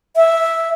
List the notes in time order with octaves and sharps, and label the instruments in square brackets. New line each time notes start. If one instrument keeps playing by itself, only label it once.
[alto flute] E5